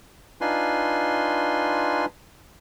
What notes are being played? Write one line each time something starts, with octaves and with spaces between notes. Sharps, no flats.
D4 D#4 F4 B4 G#5 C6